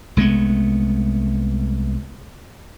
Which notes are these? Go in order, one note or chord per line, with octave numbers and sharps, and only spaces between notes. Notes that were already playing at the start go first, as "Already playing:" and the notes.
C2 G#3 A3 B3